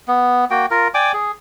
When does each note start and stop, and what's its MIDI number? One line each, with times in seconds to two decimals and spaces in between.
0.08 0.45 59
0.50 0.66 58
0.50 0.66 66
0.50 0.66 79
0.71 0.88 65
0.71 0.88 70
0.94 1.12 74
0.94 1.12 79
0.94 1.12 80
0.94 1.12 86
1.14 1.31 68